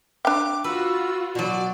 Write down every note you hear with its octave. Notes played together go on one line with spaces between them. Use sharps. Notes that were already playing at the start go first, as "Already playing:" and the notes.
D4 G5 D6
F4 F#4 B4 E6
B2 F#3 D5